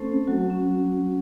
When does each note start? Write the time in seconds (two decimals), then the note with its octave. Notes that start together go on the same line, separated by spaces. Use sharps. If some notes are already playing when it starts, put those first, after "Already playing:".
Already playing: A3 C4 C#4 A4 C5
0.28 F#3 F#4
0.50 C#4